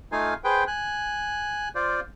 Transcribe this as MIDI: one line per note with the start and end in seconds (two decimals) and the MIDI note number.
0.12 0.34 57
0.12 0.34 63
0.12 0.34 65
0.12 0.34 77
0.12 0.34 80
0.44 0.64 68
0.44 0.64 71
0.44 0.64 72
0.44 0.64 79
0.67 1.69 80
0.67 1.69 90
1.75 2.00 65
1.75 2.00 72
1.75 2.00 74